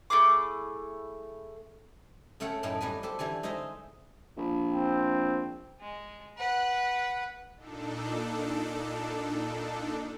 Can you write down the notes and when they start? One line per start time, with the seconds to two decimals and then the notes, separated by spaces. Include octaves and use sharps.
0.10 A3 E4 G#4 D6
2.40 C#3 A3 A4 C#5 F#5 G5
2.63 F#2 A2 A3 D#4 G#4 G5
2.81 G3 F#4 B4 G#5
3.03 G4 A4 C5
3.19 D3 E3 G3 G#5
3.43 G#3 D#4 C5 D#5 E5
4.37 A#1
4.72 C4
5.80 G#3
6.37 B4 F#5
7.56 A#2 D4 D#4 A4